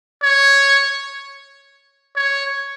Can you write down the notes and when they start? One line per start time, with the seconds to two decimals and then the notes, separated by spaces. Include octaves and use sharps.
0.23 C#5
2.16 C#5